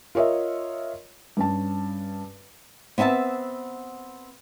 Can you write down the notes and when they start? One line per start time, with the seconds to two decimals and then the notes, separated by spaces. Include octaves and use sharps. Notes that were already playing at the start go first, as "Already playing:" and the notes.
0.15 F4 A#4 C#5 D#5 E5
1.37 G2 C#4 A5
2.98 B3 C4 E5 G#5 A5